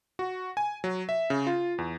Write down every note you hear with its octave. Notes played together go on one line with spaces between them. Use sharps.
F#4
G#5
F#3
E5
C#3
F4
E2